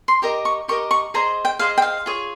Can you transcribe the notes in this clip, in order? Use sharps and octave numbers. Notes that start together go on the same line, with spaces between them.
C6
G4 A#4 D#5 A#5
C#6
G4 A#4 D#5 C#6
C#6
G#4 C5 D#5 A#5
G5
G#4 C5 D#5 F5
G5
F5
F4 G#4 C#5